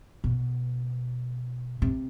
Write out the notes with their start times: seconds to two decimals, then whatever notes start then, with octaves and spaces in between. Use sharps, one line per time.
0.24 B2
1.82 C3